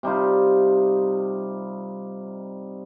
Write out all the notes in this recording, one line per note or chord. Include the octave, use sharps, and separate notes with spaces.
C3 G3 D#4 F4